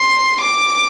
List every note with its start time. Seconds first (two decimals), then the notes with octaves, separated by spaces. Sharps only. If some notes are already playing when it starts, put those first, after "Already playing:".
Already playing: C6
0.41 D6